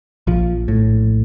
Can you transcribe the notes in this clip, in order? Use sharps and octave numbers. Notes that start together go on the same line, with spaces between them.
A#1 F3
A2